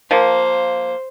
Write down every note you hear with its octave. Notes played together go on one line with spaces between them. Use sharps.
F3 A#3 C5